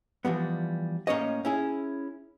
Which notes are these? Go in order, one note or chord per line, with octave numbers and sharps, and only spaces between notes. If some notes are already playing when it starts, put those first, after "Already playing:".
E3 F3 G3 B3
A2 A#3 C#4 C#5 D#5
C#4 E4 G#4